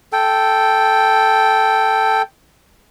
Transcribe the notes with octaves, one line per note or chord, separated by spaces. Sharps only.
A4 G5